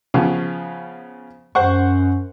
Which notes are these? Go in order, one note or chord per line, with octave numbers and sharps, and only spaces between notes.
C#3 F3 B3
F#2 C5 F#5 C#6